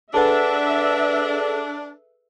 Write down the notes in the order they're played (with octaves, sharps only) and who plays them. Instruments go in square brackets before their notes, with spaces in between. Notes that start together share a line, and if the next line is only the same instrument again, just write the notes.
[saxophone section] D4 [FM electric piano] G#4 A4 B4 [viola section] E5 [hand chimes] F#5 A5